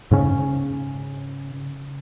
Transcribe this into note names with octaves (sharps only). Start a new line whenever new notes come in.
G#2 C#3 C#4